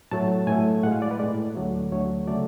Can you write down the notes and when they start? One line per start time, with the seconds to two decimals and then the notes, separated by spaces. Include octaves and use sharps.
0.11 A2 F#3 A3 A5
0.47 A2 F#3 A3 G#5
0.83 A2 G#3 F#5
0.92 F5
1.02 D5
1.11 B4
1.19 A2 G#3 D5
1.55 D2 D3 F#3 A3
1.91 D2 D3 F#3 A3 C#5
2.28 C#3 F#3 A3 D5